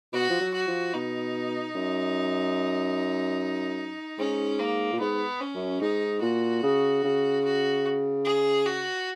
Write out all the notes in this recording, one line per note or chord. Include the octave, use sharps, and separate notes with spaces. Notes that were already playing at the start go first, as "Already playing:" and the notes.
B2 F#4
F3
F#3
F#4
F3
B2 D#4
F#2
G#2 C#4
A#3
A#2
G#2 B3
C#4
F#2
G#2 D#4
A#2 F#4
C#3
C#3
F#4
G#4
F#4